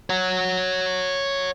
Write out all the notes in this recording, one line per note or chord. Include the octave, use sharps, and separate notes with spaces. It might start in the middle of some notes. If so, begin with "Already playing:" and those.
C#5 F#5